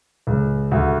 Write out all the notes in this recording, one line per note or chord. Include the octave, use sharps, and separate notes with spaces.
C#2
D2